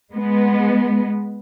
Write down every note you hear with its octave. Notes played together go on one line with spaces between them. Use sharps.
G#3 B3